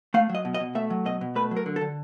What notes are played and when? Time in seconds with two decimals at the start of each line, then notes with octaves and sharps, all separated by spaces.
0.14 A3 F5
0.29 F#3
0.35 D#5
0.45 B2
0.54 D#5
0.60 B2
0.75 A3 E5
0.90 F#3
1.06 B2 D#5
1.21 B2
1.35 A3 B4
1.51 F#3
1.56 A#4
1.66 D3
1.76 A4
1.81 D3